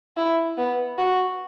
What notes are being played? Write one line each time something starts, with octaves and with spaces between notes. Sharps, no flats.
E4
B3
F#4